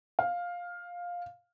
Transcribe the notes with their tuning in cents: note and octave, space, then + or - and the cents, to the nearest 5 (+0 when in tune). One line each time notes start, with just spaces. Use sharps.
F5 +10